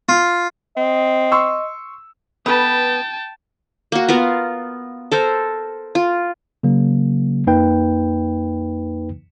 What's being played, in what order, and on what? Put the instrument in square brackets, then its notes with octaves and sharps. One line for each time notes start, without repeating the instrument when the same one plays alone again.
[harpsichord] F4
[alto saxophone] C4 [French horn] D#5
[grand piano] C6 C#6 E6
[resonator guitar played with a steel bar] B3 B4 [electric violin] G5 A5
[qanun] A#3 F#4
B3 F4 A#4 F5
A4 A#4 C5
F4
[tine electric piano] C#3 F#3 A#3
F2 A#3 D#4 B4 G5